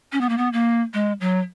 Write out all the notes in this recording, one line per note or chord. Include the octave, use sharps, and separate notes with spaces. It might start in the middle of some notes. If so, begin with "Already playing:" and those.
C#4
B3
A#3
B3
A#3
G#3
F#3